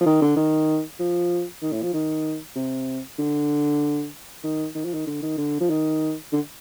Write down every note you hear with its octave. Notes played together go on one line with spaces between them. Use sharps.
F3
D#3
D3
D#3
F3
D#3
A2
F3
D#3
C3
D3
D#3
D#3
F3
D#3
D3
D#3
D3
F3
D#3
D3